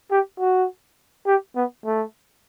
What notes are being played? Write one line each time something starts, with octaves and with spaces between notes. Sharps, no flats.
G4
F#4
G4
B3
A3